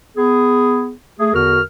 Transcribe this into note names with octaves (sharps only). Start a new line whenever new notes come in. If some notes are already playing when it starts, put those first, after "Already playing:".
B3 G#4
A3 G#4
E2 D3 F#4 A#4 F6